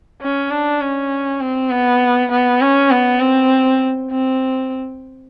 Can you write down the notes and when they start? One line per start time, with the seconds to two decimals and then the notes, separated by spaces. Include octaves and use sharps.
0.22 C#4
0.50 D4
0.81 C#4
1.40 C4
1.71 B3
2.31 B3
2.62 C#4
2.91 B3
3.20 C4
4.11 C4